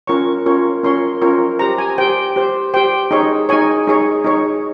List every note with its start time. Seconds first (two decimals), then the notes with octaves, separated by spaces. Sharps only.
0.07 C#4 F4 A#4 C#5 C#6
0.46 C#4 F4 A#4 C#5
0.83 C#4 F4 A#4 C#5 C6
1.22 C#4 F4 A#4 C#5
1.59 G4 C5 A#5
1.78 G#5
1.98 G4 C5 G5
2.36 G4 C5
2.74 G4 C5 G5
3.11 D#4 G#4 C#5
3.49 D#4 G#4 C#5 G#5
3.87 D#4 G#4 C#5
4.24 D#4 G#4 C#5